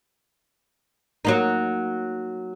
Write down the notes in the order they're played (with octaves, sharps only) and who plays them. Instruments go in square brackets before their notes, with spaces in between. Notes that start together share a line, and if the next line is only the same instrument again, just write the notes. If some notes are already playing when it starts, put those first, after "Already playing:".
[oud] F#3 A#3 D#4